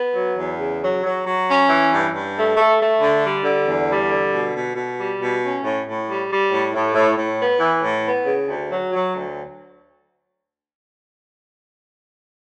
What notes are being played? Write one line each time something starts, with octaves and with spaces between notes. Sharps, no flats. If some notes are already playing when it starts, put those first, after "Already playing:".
Already playing: B3
F#3
E2
C#3
F#3
F#3
F#3
C#4
E3
G2
G2
A3
A3
A3
D3
G3
D3
E2
G3
D3
B2
B2
B2
G3
B2
C#4
A2
A2
G3
G3
A2
A2
A2
A2
B3
E3
A2
B3
C#3
D2
F#3
F#3
D2